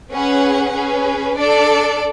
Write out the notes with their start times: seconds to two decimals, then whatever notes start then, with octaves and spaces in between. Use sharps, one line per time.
0.12 C#4 G#4 B4 F#5
0.75 C#4 G#4 B4
1.37 D4 A4 D5